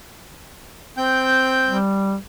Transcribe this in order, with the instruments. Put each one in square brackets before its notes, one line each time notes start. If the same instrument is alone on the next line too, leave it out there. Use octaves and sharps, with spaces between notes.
[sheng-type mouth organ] C4 G5 G6
[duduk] G3